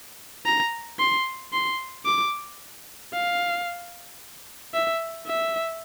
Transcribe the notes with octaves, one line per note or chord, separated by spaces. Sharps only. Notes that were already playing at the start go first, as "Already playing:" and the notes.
A#5
C6
C6
D6
F5
E5
E5